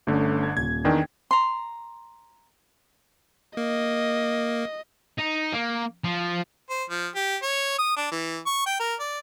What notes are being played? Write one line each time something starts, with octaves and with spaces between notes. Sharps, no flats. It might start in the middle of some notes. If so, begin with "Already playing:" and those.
G1 D3 A3 C#4
G#6
D#1 G#6
E2 D#3 D4 G5
A#5 C6
A#3 D#5
D#4
A#3
F3
C5
F3
G4
C#5
D#6
D4
E3
C#6
G5
A#4
D5